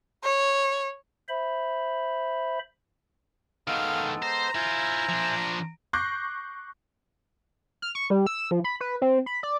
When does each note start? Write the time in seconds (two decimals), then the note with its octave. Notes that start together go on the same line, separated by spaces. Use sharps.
0.24 C#5
1.29 C5 E5 B5
3.67 D#3 G#3 A3 B3 A4 F5
4.22 C5 A#5
4.55 E4 F4 C5 E5 G#5
5.09 F3 D4
5.93 C#6 D6 F#6 G6 A#6 C7
7.82 F6
7.95 C#6
8.10 G3
8.26 E6
8.51 F3
8.64 B5
8.81 B4
9.02 C4
9.26 B5
9.43 D5